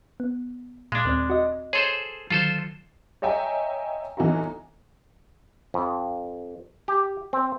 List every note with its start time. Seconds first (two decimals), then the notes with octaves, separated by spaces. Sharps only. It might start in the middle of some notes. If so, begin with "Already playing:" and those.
0.20 B3
0.92 A#2 G#3 D4
1.05 D#2 C4 D5
1.30 F#4 D#5
1.73 G#4 A4 C5 C#5 C6 G#6
2.30 D3 D#3 F#3 F4 A4 C5
3.22 C#5 D#5 E5 G5 G#5 A#5
4.17 G1 E3 D#4 E4 F#4 A#5
5.74 F2
6.88 G4
7.33 C4